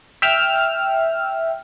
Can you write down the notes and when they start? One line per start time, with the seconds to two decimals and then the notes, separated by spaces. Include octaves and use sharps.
0.22 E5 G5 E6 F6